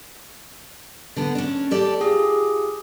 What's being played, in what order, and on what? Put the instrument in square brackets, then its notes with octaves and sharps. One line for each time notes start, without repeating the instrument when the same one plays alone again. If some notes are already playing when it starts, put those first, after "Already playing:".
[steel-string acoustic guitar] D3 B3
C#4 D4
G4 A4 D5
[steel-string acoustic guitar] F4 [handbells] G4 G#4